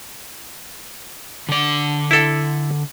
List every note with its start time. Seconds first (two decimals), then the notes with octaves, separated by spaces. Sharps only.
1.49 D3 D5
2.11 E4 A4